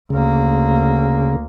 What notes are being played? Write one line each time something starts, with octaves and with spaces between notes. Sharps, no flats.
D2 C#3 A#3